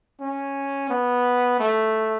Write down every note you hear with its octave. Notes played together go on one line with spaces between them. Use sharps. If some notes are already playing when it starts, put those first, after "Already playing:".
C#4
B3
A3